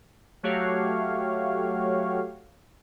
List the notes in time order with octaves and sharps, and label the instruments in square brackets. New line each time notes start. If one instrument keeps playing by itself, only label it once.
[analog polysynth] F#3 A3 F#4 G4 C#5 F5